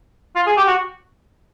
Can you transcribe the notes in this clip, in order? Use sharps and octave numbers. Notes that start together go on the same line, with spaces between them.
F4
G#4
G4
F#4